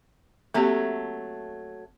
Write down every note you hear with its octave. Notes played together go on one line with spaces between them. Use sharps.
F#3 A3 A#3 C4 G4